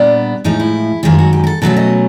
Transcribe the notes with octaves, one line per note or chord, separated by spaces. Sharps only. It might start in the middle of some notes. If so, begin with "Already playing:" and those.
Already playing: A#2 G3 B3 D4
A2 F3 G#3 D#4
E4
F#2 D#3 G#3 F4
F#4
G4
A#4
A4
B2 F#3 A3 C#4 A4
D#5